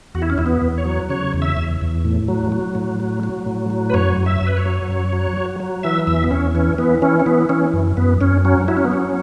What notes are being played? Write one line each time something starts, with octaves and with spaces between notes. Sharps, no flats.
E2 F#4
E4
C#4
E2 E4
B3
E2
C#5
F#3
C#3 C#5
E2
E5
E2
E2
A2
F#3
F#3
A2
F#3
F#3
A2
F#3
B4
F#2 C#5
F#2
E5
F#2
B4
C#5
F#3
F#2
F#3
F#3
F#3
E3 E5
E2 E5
B3
E2 C#4
E3 C#4
E3 B3
E3 C#4
C#4
E3 B3
E3 C#4
F#2
F#2 B3
F#2 C#4
F#3 C#4
F#3 E4
C#4
B3
F#3 C#4